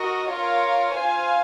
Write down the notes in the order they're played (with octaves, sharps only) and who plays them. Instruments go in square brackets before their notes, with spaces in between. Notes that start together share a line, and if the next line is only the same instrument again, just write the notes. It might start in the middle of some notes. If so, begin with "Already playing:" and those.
Already playing: [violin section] F#4 A#4 D#5
F4 A#4 C#5 F5
F4 C5 F5 G#5